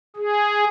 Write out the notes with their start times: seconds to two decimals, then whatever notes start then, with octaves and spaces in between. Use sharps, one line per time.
0.16 G#4